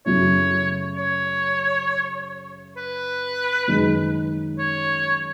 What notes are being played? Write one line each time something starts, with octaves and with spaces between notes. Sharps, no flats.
F#2 C#3 F#3 A3 E4 C#5
C#5
B4
F#2 D#3 G#3 D#4 G#4
C#5